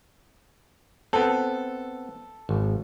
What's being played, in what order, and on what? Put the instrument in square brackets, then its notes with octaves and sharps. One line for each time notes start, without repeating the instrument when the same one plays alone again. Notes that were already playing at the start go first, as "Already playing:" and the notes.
[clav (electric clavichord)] B3 C4 [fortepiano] A4
[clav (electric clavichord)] G#1